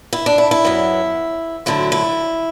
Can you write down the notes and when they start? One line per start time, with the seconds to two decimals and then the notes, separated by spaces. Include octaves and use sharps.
0.13 E4
0.26 D4
0.38 E4
0.51 E4
0.65 F#2 F#3 B3
1.66 D2 D3 F#3 E4
1.92 E4